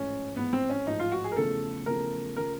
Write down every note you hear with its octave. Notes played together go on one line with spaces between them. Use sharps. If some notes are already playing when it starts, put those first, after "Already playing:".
Already playing: A1 G#2 F3 C#4
A1 G#2 F3 B3
C4
C#4
A1 G#2 F3 D#4
F4
F#4
G#4
A#4
E2 C#3 F3 A3 C#4 A4
E2 C#3 F3 A3 C#4 A#4
C#3 F3 A3 C#4 A#4